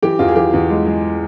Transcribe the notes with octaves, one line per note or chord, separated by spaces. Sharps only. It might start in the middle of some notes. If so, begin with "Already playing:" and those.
E3 G4
E2 F4
G#4
E3 G4
E2
G#3
G#3